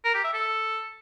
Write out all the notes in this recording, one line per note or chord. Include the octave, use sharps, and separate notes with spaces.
A#4
G4
E5
A4